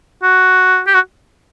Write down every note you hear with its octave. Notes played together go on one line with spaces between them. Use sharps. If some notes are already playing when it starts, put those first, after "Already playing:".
F#4
G4
F#4